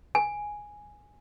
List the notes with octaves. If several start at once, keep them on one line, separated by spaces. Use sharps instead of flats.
G#5